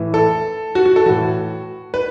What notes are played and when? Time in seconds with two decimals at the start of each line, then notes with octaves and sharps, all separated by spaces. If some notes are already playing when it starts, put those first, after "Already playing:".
Already playing: A2 E3
0.14 A4
0.75 F#4
0.85 F#4
0.96 A4
1.06 A2 E3 F#4
1.94 B4